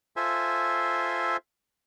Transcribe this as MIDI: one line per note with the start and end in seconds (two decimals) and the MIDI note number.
0.16 1.37 65
0.16 1.37 69
0.16 1.37 72
0.16 1.37 76
0.16 1.37 80